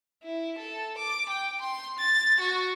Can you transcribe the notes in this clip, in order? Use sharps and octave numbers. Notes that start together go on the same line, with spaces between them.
E4
A4
D6
G5
C6
A6
F#4